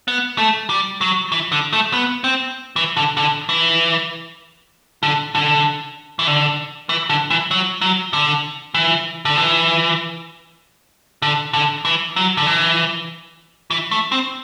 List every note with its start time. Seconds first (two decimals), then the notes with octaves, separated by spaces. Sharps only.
0.08 B3
0.38 A3
0.69 G3
1.01 F#3
1.32 E3
1.52 D3
1.73 A3
1.93 B3
2.24 C4
2.76 E3
2.97 D3
3.17 D3
3.49 E3
5.03 D3
5.35 D3
6.19 E3
6.27 D3
6.89 E3
7.09 D3
7.30 E3
7.51 F#3
7.81 F#3
8.13 D3
8.74 E3
9.25 D3
9.37 E3
11.22 D3
11.53 D3
11.85 E3
12.16 F#3
12.37 D3
12.46 E3
13.71 E3
13.91 A3
14.12 C4